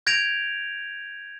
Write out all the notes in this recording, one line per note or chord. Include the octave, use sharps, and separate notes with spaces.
G6 G#6 A#6 D7 F7